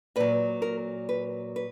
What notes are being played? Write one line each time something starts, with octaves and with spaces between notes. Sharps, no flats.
A#2 F#3 B4
A#4
B4
B4